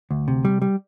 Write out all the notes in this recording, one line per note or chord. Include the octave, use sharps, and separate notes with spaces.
D2
C3
G3
G3